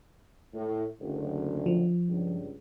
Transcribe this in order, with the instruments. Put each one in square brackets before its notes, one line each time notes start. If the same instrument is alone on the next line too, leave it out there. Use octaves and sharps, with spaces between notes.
[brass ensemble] A2
F#1 D2
[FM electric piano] F3
[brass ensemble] C#2 G2